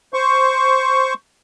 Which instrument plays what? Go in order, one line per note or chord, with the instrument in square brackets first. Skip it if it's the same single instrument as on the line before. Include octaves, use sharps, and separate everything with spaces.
[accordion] C5 C#6